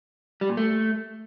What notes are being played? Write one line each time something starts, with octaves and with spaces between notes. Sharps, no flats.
G3
A#2
A3